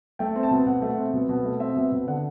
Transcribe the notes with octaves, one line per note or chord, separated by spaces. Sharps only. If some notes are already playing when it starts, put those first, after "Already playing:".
A3 G5
C4
A5
B2
B2 F#5
A3
C4
B2
B2
A3
C4 E5
B2
B2
D3 F#5